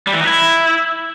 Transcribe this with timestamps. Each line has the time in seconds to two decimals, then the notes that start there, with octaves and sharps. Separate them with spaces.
0.07 G3
0.14 E3
0.20 D#4
0.27 E4